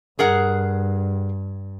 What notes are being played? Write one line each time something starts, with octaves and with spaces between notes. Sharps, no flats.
G2 G#4 A#4 F#5